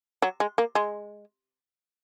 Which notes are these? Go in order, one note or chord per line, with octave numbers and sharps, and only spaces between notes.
F#3
G#3
A#3
G#3